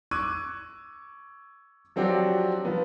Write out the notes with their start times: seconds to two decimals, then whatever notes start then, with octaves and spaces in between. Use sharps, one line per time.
0.11 C#6 D6 E6 F#6 G#6 D#7
1.96 F3 F#3 C4 D4 F#4 G4
2.65 F3 B3